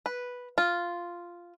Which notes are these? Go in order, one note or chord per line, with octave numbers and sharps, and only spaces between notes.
B4
F4